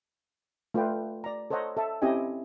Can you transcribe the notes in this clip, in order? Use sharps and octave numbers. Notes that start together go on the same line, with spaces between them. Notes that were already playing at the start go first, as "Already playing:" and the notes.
A3 F4 B4 D5 G5
D5 A#5
A4 C5 C#5 D#5 F#5 A#5
A4 E5 A5
C4 C#4 E4 G4 D#5 G#5